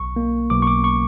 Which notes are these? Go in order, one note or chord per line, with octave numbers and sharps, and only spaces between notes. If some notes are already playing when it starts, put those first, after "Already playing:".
Already playing: B1 C#6
A#3
B1 D6
C#6
D6
C#6